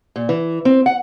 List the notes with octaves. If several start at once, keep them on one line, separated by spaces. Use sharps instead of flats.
A#2
E3
C4
F#5